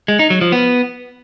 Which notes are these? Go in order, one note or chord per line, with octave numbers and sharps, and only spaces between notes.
G#3
D#4
F#3
F3
B3